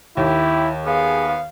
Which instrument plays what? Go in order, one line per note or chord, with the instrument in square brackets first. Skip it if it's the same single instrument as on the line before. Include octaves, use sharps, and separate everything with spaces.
[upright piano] D#2 [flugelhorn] E4 [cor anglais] G4
[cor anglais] B3 [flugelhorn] G#4 [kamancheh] F5